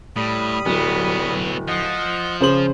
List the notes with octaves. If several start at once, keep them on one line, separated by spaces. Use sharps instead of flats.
A2 G3 B5 D#6
D1 F#3 B3
F3 D#5 F#5
C#3 C5 F#7